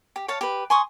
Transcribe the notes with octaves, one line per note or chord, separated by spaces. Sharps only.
G4
C#5 F5 A5
G4 B4
G#5 C6 C#6 D#6